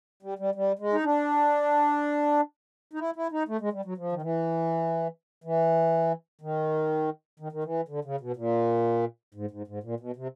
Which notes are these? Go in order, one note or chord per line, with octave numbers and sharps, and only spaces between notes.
G3
G3
G3
G#3
D#4
D4
D#4
E4
E4
D#4
A3
G#3
G3
F#3
F3
D#3
E3
E3
D#3
D#3
D#3
E3
D3
C#3
B2
A#2
G#2
G#2
G#2
A#2
B2
C3